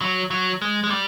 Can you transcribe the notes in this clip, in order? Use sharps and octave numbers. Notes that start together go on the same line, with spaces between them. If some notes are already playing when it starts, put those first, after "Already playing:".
F#3
F#3
G#3
G#3
G3